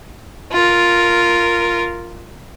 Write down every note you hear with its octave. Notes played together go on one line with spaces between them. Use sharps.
F4 A#4